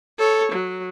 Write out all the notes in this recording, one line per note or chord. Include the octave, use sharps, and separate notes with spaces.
A4 C#5
F#3